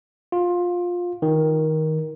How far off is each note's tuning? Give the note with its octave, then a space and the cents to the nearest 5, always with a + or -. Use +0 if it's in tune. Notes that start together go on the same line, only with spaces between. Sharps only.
F4 +15
D#3 +15